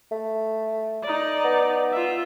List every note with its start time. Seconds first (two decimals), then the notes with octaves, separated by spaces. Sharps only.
0.12 A3
1.03 D#4 D5
1.44 B3
1.92 F4 E5